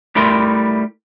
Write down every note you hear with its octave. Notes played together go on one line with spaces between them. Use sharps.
G3 A3 E4 A#4 C6